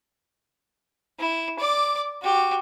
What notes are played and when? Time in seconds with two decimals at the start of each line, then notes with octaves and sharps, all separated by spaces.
1.20 E4
1.60 D5 D6
2.22 F#4 G4